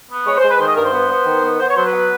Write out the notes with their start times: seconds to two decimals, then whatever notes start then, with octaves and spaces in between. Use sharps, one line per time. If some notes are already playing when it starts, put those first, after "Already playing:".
0.10 B3
0.26 G#3 C#5
0.38 C5
0.43 G#3
0.49 B4
0.60 D#3 C5
0.68 D#5
0.76 G2 A#4
0.84 C5
0.92 B3
1.09 B3
1.26 D#3
1.43 B3
1.59 B3 C5
1.68 C#5
1.76 F#3 C5
1.85 B4
1.93 B3